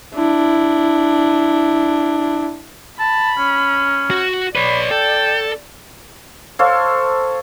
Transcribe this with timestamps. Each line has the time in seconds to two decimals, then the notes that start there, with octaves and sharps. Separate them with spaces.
0.14 D4 E4
2.99 A5 B5
3.38 C#4
4.11 F#4
4.56 B4 C#5 D5 B5
4.91 A4 G5
6.59 A4 C5 C#5 F5